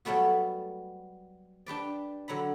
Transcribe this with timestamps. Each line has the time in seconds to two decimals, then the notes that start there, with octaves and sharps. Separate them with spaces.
0.05 F#3 G3 A3 B3 F#4
1.66 D4 G4 B4 D5
2.28 D3 F#3 A#5 B5